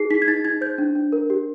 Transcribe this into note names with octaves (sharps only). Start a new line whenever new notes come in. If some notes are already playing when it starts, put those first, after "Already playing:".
Already playing: D#4 G#4 C7
D#4 B6
G#6
D#4 A6
D#4 G#6
C5 G6
D4
D4
A#4
G4